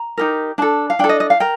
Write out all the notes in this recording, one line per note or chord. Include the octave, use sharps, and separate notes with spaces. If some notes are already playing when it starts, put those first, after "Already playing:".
Already playing: A#5
D#4 G4 A#4
D4 A4 A5
F5
D4 A4 G5
D#5
D#5
F5
A#4 G5